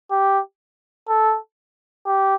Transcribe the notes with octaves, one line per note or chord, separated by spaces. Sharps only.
G4
A4
G4